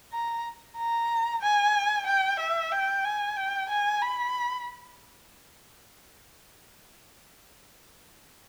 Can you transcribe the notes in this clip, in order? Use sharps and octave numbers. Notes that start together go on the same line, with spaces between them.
A#5
A#5
G#5
G5
E5
G5
G#5
G5
G#5
B5